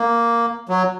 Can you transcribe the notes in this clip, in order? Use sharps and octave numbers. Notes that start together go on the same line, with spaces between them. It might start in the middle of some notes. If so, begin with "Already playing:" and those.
Already playing: A#3
F#3